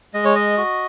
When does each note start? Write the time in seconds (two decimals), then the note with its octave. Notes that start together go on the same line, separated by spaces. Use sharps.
0.14 G#3 D#5
0.25 C#5
0.35 D#5
0.57 F#4